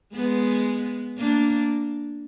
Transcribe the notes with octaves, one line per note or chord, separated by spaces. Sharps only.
G#3 B3
A#3 D4